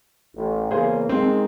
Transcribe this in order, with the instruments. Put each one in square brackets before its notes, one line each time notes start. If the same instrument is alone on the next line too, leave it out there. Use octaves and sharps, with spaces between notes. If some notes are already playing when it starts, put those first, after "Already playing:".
[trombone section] A1
[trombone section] E2 C#3 A#3 [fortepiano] G#4 C5
[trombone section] D#3 G#3 [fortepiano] C4